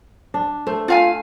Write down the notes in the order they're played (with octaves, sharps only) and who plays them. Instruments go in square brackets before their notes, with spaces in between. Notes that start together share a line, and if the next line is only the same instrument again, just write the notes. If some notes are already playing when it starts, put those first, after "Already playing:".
[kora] D4
[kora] A3 [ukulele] C5
[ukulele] F4 F5 G#5